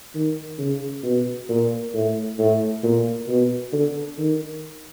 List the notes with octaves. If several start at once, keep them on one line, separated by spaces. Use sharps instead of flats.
D#3
C#3
B2
A#2
A2
A2
A#2
B2
D3
D#3